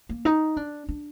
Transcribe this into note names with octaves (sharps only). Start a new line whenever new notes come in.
A#3
D#4
D4
D4